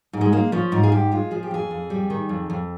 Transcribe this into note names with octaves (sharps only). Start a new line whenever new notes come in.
G#2
G#3
G#3 A#3
F3 C#4
G#2 F4
G#4
G#2 G4
G#3 F4
F3 G#4
G4
F2 G#4
F2
G3
D#3
F2
F2